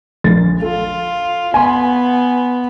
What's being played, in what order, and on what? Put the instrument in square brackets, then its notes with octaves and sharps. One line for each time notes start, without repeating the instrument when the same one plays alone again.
[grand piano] A#1 A6
[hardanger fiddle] F4 [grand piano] A4
[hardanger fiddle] B3 [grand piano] G#5 C6